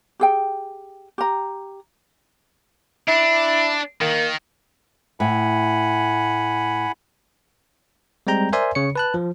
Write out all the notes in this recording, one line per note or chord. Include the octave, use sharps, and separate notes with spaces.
G4 G#4 G5
G4 A#5
D4 E4
D#3 A#3
A2 F#5 G#5 B5
G3 G#3 C4 G5 A#5 G6
A#4 C5 D5 E5 G#5 C6
C#3 C#5 C#7
B4 A5 F#6
F3